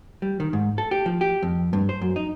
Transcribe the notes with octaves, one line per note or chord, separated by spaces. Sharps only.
G3
D#3
G#2
A4
G4
F3
G4
F2
G2
C5
F#2
D#4